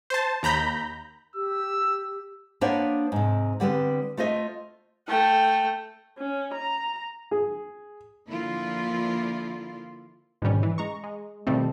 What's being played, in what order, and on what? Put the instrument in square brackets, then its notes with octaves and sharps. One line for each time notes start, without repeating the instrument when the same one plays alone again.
[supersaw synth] C5 A5
D#2 A#5 B5 G6
[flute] G4 [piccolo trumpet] E6
[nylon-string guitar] A#3 B3 D4 C5 C#5 E5
G#2 C3
D3 G3 B3 C4
A3 F4 C5 D#5 E5
[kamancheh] A3 G5
[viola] C#4
A#5
[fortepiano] G#4
[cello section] D3 F3 A#3 E4 F4 D5
[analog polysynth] G#2 B2 D#3 G3 C#4
E3
G#3 A#5 C#6
G#3
B2 D#3 F3 G3 A3 C4